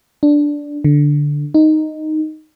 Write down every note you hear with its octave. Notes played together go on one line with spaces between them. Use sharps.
D4
D3
D#4